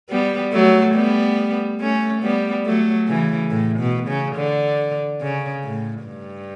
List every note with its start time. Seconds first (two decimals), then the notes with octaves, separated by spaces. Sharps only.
0.10 G3 B3
0.53 F#3 A3
0.95 G3 B3
1.81 A3 C#4
2.23 G3 B3
2.66 F#3 A3
3.08 C#3 E3
3.51 A2
3.79 B2
4.08 C#3
4.36 D3
5.21 C#3
5.64 A2
6.06 G2